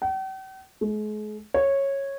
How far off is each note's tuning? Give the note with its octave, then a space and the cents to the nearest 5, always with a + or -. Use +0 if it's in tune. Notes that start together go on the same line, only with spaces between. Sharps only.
G5 -45
G#3 +40
C#5 -10